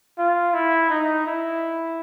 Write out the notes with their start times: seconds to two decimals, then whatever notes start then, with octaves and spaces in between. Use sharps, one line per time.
0.18 F4
0.53 E4
0.90 D#4
1.27 E4